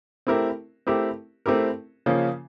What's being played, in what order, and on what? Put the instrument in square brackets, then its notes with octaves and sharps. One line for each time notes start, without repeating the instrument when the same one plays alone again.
[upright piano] A3 C4 E4 G4 A#4
A3 C4 E4 G4 A#4
A3 C4 E4 G4 A#4
C#3 F3 A#3 C#4